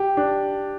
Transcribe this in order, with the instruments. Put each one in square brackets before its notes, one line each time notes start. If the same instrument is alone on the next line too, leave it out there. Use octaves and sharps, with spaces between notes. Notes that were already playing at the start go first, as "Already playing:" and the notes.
Already playing: [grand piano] G4
D4